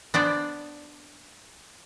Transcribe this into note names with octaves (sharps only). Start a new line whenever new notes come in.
B3 D4 C5 D5